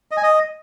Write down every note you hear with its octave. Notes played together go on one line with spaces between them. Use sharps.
D#5
G#5
D#5